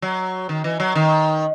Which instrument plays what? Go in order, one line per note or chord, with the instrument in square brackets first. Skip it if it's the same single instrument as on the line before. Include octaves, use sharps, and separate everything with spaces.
[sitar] F#3
D#3
E3
F#3
D#3